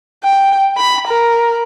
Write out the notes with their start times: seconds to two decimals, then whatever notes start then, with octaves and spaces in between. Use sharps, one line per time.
0.24 G5
0.77 B5
1.08 A#4